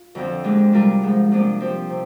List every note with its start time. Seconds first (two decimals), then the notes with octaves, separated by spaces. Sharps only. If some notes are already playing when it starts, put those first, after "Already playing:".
Already playing: F4
0.15 F2 D3 F3 C4
0.44 A#2 G#3 D4 G4
0.73 C3 G3 D4 F4 A#4
1.02 G#2 F3 G#3
1.32 C3 F3 A#3 D4 F4
1.60 F3 C4 G4 C5
1.89 C3